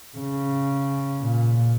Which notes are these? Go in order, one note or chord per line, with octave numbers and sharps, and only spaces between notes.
C#3
A#2